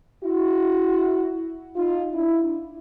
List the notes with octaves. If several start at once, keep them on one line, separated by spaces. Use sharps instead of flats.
E4 F#4
D#4 F4
D4 E4